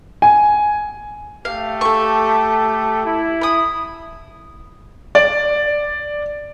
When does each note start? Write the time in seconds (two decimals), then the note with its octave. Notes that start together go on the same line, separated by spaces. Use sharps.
0.22 G#5
1.45 A3 G4 F5
1.81 A4 C#6
3.06 E4
3.41 B5 D#6
5.15 D5